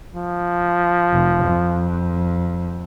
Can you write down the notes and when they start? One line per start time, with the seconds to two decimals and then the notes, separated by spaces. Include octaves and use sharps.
0.15 F3
1.12 F1
1.44 F2